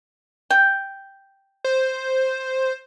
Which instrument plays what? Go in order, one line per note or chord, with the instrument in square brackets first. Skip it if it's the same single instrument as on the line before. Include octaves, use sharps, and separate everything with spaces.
[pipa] G5
[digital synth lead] C5